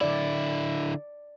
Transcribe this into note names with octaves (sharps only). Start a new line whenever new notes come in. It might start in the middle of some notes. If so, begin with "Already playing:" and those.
D3 E4 D5